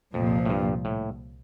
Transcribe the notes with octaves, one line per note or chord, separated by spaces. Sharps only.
C2 F2 A#2 F3
A2
G2
A2